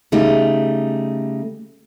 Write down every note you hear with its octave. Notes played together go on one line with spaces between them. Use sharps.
C#3 G3 A3 D#4